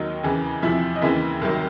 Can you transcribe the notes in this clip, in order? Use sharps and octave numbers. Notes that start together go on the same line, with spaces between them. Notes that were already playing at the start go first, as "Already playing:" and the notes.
Already playing: D#2 D#3 F#3 D#4
E2 C#3 E3
E2 C3 F3 E4 E5
D#5
D#2 C#3 E3 E4 E5
C2 C3 D#3 F#3